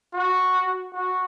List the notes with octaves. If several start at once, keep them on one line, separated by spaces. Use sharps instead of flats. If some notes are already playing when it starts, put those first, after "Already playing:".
F#4
F#4